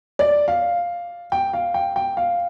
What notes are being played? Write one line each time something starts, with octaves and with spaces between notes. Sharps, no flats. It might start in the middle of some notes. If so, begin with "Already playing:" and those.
D5
F5
G5
F5
G5
G5
F5